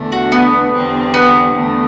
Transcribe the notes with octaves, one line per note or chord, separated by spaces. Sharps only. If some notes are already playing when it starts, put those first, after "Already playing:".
Already playing: E2 D3 A3 D4
F#4
B3
E2 D3 G3 C4
B3
E2 D3 A3